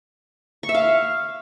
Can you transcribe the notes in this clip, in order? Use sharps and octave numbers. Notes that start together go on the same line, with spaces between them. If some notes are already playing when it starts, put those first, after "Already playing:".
C#6
E5
F5